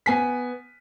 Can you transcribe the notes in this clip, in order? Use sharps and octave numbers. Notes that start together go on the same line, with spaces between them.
B3 G#5 B6